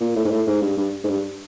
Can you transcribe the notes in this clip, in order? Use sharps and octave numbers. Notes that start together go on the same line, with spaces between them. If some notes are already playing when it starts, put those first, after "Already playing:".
A#2
A2
G#2
A2
G#2
G2
G2
G#2
G2